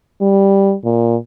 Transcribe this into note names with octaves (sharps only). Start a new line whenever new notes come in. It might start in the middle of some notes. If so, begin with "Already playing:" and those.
G3
A#2